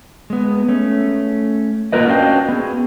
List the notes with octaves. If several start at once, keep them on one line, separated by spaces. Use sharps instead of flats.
G#3 B3
A3 C#4
A#3 F4 A#4 B4 D#5
C#4 D4 F#4 D#5 F5 G5
B3 C4 G#4